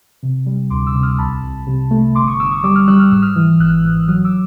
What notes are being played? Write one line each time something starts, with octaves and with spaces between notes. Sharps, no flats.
C3
G3
D2 C6 D6
D6 E6
C3
D#6 F6
C2 A5 B5
C2
C3
A3
G1 C6 D6
C#6 D#6
G1 D6 E6
C#6 D#6
G3 D6 E6
D#6 F6
G3 E6 F#6
F6
G#2 E6
D#6 F6
E3
G#1 E6 F#6
G#2
E6
F#3 D#6 F6
D6 E6